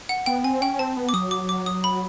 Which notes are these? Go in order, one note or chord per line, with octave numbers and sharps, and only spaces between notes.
F#5
B3 G5
C4 G#5
C#4 G5
C4 A5
B3
D6
F#3 D#6
D6
D6
D#6
B5